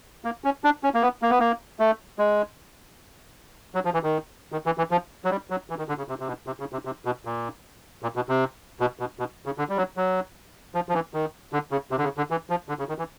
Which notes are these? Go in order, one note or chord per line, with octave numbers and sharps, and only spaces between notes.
A#3
C#4
D4
C#4
A#3
B3
A#3
B3
A#3
A3
G#3
F#3
F3
E3
D#3
D#3
E3
E3
F3
F#3
G3
F#3
E3
D#3
D3
C#3
C3
C3
B2
C3
C#3
C3
C3
B2
A#2
A#2
B2
C3
B2
B2
B2
C#3
D3
G3
F#3
F#3
F3
F3
E3
D#3
D3
C#3
C3
D3
C#3
D3
E3
F3
D3
C#3
D#3
E3